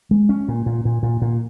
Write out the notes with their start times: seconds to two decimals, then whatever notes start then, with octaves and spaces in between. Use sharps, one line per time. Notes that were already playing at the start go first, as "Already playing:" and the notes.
0.11 G#3
0.29 C#4
0.48 A#2
0.66 A#2
0.85 A#2
1.03 A#2
1.22 A#2